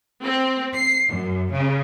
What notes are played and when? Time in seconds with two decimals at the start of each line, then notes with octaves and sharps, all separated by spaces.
0.24 C4
0.76 C7
1.10 F#2
1.51 C#3